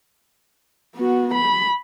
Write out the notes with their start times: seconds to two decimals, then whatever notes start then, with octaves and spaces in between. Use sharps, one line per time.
0.95 B3 F#4
1.34 B5